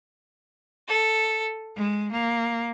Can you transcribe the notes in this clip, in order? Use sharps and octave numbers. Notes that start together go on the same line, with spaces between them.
A4
G#3
A#3